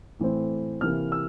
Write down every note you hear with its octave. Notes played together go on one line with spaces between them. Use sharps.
A2 E3 A3 C4
C3 E3 A#3 F6
E6